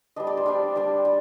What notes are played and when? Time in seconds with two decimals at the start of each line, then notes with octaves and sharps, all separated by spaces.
0.16 G3 D4 D#5
0.27 D5
0.37 C5
0.46 G3 D4 D5
0.76 G3 D4
1.05 G3